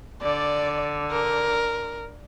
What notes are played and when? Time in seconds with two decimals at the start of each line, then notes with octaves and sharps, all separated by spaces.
0.22 D3 D5
1.12 A#4